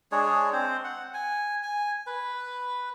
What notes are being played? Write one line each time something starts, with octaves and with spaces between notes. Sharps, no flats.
G#3 D4 G#4 C#5
C4 C5
F#5
G#5
G#5
B4